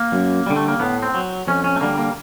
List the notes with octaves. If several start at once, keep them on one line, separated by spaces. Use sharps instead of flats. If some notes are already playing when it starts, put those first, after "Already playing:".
Already playing: A#3
F#2
D3 G3
A3
A#3
A2 B3
C4
F#3
F2 C#4
C#4
A3
D3 G3 A#3
A#3